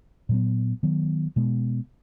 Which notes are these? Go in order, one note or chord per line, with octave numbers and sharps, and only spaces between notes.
A#2 F#3 B3
D#3 F#3 B3
B2 G#3 B3